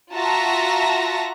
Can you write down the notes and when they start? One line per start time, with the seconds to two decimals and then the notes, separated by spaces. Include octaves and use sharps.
0.14 F4 F#4 E5 A5 A#5 A#6